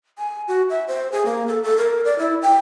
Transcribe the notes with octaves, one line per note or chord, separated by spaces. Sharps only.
G#5
F#4
E5
C5
G#4
A#3
A4
A4
A#4
D5
E4
G5